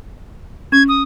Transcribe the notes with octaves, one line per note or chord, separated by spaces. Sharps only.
C#4 G#6
D#6